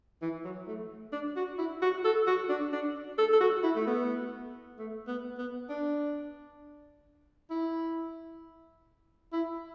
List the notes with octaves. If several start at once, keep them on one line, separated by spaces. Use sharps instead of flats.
E3
F#3
A3
D4
F#4
E4
F#4
A4
F#4
D4
D4
A4
A4
F#4
E4
A3
B3
A3
B3
B3
D4
E4
E4